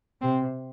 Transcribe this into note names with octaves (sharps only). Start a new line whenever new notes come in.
C3 C4